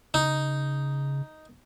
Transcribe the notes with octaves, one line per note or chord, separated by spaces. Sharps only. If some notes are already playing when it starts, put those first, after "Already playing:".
C#3 D#4